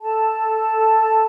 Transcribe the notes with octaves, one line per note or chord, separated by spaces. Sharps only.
A4 A5